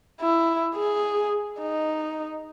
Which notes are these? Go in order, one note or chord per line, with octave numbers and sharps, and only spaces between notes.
E4
G#4
D#4